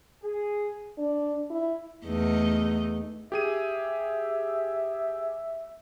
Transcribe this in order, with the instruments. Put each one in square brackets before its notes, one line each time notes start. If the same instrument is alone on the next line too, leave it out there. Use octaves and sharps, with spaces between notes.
[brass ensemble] G#4
[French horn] D4
E4
[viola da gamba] E2 A3 D#4
[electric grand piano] G4 G#4 D#7 [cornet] E5